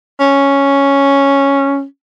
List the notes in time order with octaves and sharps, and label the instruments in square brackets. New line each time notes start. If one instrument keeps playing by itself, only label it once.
[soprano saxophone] C#4